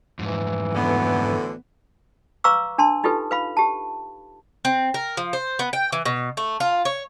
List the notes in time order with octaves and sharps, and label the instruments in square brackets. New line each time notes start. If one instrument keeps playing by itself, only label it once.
[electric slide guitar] F2 G#2 [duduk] E3
[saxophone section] D2 A2 D3 [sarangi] B3
[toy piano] B4 F5 A#5 C#6 D6 E6
D4 A5 C6
D#4 F4 G4 A4 B4
B4 F5 B5
G4 A5
[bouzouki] C4
A#4
F3
C5
B3
G5
E3
B2
A3
F4
C#5